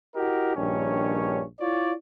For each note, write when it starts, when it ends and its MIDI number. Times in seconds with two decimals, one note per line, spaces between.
0.15 0.54 64
0.15 0.54 66
0.15 0.54 67
0.15 0.54 70
0.15 0.54 75
0.56 1.43 34
0.56 1.43 43
0.56 1.43 51
0.56 1.43 61
0.56 1.43 73
1.59 1.93 64
1.59 1.93 65
1.59 1.93 73
1.59 1.93 74